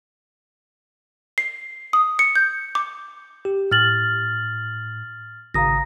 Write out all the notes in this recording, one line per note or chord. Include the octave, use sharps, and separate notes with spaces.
C7
D#6
C#7
G6
D6
G4
A2 F6 A6 F#7
G#1 C#3 F5 A#5 D#6 A#6